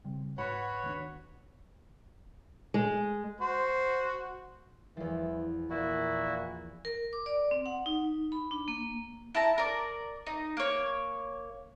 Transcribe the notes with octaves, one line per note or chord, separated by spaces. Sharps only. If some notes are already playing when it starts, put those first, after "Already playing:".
C#3 G3 C4
G#2 F#4 B4 C#5 F#5 B5
D#2 C4 D4
G#3
F#4 C5
E2 E3 F3
A#2 E4 F#4
A#4
D6
D5
C4
F#5
D#4
B5
D4
A#3
E4 A5 A#5
A#4 D5
D#4
A#3 C#5